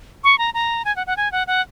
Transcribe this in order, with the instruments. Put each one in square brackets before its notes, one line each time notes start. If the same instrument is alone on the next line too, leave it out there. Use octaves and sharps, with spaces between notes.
[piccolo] C#6
A#5
A#5
G#5
F#5
F#5
G#5
F#5
F#5